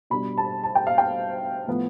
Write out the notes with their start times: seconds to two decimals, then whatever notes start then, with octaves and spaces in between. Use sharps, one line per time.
0.10 B2 G3 D4 B5
0.38 A5
0.64 A5
0.75 G5
0.87 F5
0.98 G5
1.67 A2 F3 B3